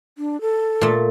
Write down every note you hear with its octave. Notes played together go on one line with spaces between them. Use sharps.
D4
A4
A#2 A3